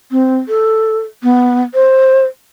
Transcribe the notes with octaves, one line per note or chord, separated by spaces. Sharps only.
C4
A4
B3
C5